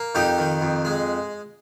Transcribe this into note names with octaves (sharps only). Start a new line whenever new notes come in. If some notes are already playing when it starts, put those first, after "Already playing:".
Already playing: A#3
F2 D#4 G4
D#3
F2
G#3